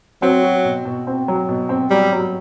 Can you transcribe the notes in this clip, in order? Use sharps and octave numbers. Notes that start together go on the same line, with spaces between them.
F#3 C4
F#4
B2
B2
C4
F#3
B2
C4
F#3 G3
F#3